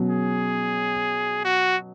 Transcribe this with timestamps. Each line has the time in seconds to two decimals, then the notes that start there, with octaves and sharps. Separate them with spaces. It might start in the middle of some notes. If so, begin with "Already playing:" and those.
Already playing: B2 F#3 C#4
0.09 G#4
1.45 F#4